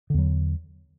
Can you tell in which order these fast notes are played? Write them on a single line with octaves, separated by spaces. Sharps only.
D3 E2 F#3